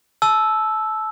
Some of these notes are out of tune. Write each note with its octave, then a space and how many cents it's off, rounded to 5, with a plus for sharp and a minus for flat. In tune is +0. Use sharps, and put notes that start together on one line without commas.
A5 -25 E6 +0